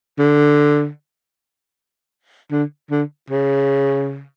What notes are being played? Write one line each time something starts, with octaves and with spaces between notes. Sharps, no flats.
D3
D3
D3
C#3